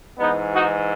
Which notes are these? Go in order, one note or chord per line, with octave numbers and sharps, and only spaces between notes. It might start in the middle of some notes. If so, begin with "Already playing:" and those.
G#2 E3 B3 D#4
D#4 F#4